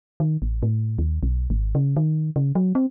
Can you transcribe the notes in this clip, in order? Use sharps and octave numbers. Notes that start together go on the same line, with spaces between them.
D#3
A1
A2
D#2
B1
G#1
C#3
D#3
C#3
F#3
C4